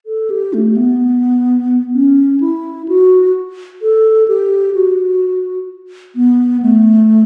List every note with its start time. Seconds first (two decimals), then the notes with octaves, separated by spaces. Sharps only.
0.06 A4
0.30 G4
0.54 A3
0.77 B3
1.94 C#4
2.40 E4
2.88 F#4
3.82 A4
4.28 G4
4.75 F#4
6.15 B3
6.62 A3